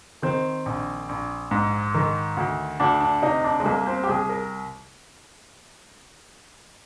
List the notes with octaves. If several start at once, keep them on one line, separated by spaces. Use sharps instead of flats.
D#3 C4
A#1
A#1
G#2
D#3
D2
D2 D4
D4
C3 D#4
D4
G#3
C2 A#3
C4
G4
C2 G#4
A#4